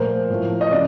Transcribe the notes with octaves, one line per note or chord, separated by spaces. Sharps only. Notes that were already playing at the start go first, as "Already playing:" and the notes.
Already playing: A#2 F3 A3 A#4 C5
A2 F3 A3
D#5
C#3 D5